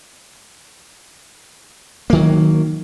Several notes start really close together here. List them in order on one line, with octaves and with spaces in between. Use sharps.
A#3 D#3 F#3